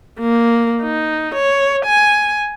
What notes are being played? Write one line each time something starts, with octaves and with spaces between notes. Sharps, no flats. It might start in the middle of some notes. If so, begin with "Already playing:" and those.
A#3
D#4
C#5
G#5